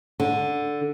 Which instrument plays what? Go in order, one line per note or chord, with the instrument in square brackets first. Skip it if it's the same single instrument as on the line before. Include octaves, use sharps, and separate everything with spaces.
[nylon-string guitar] D3